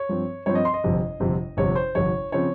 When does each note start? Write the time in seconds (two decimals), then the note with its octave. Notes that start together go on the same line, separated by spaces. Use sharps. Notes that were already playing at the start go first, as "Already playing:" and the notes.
Already playing: C#5
0.09 G2 F3 C4
0.46 G2 F3 C4 C#5
0.55 D#5
0.65 C6
0.74 D#5
0.84 G1 F2 C3
1.20 G1 F2 C3
1.57 G1 F2 C3 C#5
1.75 C5
1.95 G1 F2 C3 C#5
2.32 C#3 F3 C4 C#5